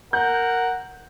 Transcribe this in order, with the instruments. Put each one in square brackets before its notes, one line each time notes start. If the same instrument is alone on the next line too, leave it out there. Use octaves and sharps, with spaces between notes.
[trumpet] A#4 [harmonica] F#5 [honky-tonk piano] G6